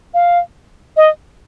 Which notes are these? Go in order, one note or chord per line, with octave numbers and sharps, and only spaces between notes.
F5
D#5